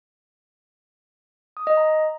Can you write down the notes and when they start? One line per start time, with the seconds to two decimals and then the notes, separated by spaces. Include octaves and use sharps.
1.57 D#6
1.67 D#5
1.77 A#5